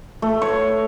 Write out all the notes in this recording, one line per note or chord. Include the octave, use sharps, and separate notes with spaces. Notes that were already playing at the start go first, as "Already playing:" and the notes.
A3
C#5